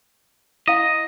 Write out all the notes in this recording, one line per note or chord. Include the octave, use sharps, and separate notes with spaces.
E4 D#5 F5